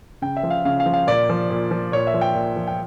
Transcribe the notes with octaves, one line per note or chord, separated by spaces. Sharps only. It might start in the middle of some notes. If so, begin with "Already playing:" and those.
C#3 G5
E5
F3
F5
C#3 F5
F5
F3
F5
A#2 D5
F3
A#2
F3
A#2 C#5
E5
F3
G5
A#2
F3
G5